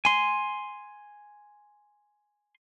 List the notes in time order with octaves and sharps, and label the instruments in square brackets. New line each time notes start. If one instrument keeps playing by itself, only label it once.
[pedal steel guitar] G#5 C6